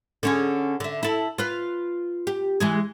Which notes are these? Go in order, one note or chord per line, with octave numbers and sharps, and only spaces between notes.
D3 C#4 G#4
D3 E5
E4 A4
F4 B4
G4
E3 G#3 G#4